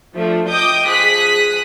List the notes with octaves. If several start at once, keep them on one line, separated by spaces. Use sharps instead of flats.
F3 A3 D4
D#5 G5 D6 D#6 G6
F3 G#4 D#6 F#6 B6